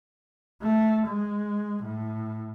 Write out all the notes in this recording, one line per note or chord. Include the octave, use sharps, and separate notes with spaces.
A3
G#3
A2